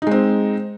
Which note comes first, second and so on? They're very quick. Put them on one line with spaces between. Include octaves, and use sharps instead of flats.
D#4 G#3 C4